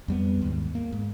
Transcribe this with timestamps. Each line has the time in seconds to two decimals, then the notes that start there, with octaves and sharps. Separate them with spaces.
0.08 F2 G3 B3
0.42 D#2 G#2
0.75 A#3
0.92 G#2